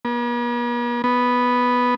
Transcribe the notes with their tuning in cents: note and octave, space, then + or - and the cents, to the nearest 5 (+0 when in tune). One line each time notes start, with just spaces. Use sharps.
B3 -45
B3 +0